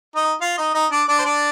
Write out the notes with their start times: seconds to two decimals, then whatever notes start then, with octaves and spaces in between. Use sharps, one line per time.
0.15 D#4 D#5
0.41 F4 F5
0.58 D#4 D#5
0.74 D#4 D#5
0.92 D4 D5
1.08 D4 D5
1.18 C5
1.25 D4 D5